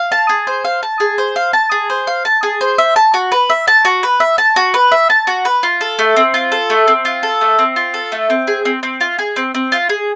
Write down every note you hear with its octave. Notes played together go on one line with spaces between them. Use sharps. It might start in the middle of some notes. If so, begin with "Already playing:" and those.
Already playing: F5
A5
G#4
C5
F5
A5
G#4
C5
F5
A5
G#4
C5
F5
A5
G#4
C5
E5
A5
F#4
B4
E5
A5
F#4
B4
E5
A5
F#4
B4
E5
A5
F#4
B4
F4
A4
A3
C4
F4
A4
A3
C4
F4
A4
A3
C4
F4
A4
A3
C4
G#4
C4
C4
F4
G#4
C4
C4
F4
G#4